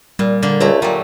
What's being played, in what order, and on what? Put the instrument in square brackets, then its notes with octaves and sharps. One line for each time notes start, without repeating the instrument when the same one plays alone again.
[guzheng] A#2 [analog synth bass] G3
[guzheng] D3 A#3
[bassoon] C#2 [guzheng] A3 E4 A#5
[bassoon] A#2 [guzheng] F#3 G3